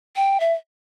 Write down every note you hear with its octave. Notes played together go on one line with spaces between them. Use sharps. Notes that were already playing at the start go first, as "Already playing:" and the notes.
G5
E5